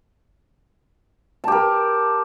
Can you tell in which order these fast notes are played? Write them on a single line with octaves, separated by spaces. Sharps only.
A5 G4 A#4